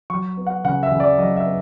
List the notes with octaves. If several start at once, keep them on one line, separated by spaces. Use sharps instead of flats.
F#3 C#6
B3
F#5
C#3 F#5
E5
C#3
D5
F#3 D#5
E5
B3